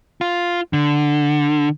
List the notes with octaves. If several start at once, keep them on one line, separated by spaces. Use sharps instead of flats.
F4
D3